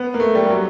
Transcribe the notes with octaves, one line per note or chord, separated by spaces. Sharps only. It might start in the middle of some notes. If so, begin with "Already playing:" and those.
Already playing: B3
A#3
A3
G3
G3
F#3